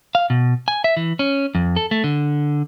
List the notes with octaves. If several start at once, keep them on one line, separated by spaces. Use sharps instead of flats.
F5
B2
G#5
E5
E3
C#4
F2
A4
A3
D3